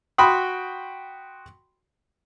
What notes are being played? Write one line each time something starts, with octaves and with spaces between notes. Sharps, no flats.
F#4 G5 B5 C6 D#6